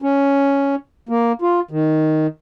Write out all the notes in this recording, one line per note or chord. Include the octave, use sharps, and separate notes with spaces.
C#4
A#3
F4
D#3